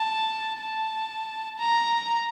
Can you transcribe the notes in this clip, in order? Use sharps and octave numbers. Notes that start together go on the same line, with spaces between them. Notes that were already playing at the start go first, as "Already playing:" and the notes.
Already playing: A5
A5
A#5